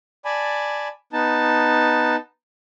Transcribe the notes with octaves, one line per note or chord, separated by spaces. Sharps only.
D5 G#5 A5 B5
B3 D#4 A5